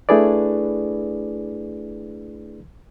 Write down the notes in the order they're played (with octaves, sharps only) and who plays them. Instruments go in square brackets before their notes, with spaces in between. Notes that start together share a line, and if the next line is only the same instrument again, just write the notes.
[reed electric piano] A3 D4 E4 G#4 B4 D5